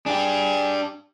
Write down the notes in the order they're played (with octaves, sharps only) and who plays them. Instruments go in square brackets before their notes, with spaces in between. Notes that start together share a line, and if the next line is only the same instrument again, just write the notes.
[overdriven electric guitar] D4 G4 [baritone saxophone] G#4